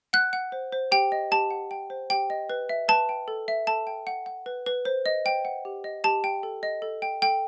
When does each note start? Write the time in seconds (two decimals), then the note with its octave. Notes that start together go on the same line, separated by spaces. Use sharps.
0.13 F#5 F#6
0.33 F#5
0.52 C5
0.72 C5
0.92 G4 G5
1.12 D#5
1.31 G4 A5
1.51 F#5
1.71 G5
1.90 C5
2.10 G4 G5
2.30 D#5
2.50 B4
2.69 E5
2.88 B4 A5
3.09 G5
3.28 A4
3.48 E5
3.67 A4 A5
3.87 G5
4.07 F#5
4.26 F#5
4.46 B4
4.66 B4
4.85 C5
5.06 D#5
5.25 C5 G5
5.45 F#5
5.65 G4
5.84 D#5
6.04 G4 A5
6.24 G5
6.43 A4
6.63 D#5
6.82 A4
7.02 G5
7.22 A4 G5